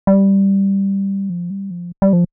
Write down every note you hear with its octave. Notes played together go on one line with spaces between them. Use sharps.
G3
F3
G3
F3
G3
F3